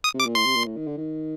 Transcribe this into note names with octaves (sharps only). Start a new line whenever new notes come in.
D#6
C3
D6
A#2
A2 C6
C3
A#2
A2
D#3
D3
D#3